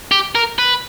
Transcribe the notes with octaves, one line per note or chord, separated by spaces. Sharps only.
G4
A#4
B4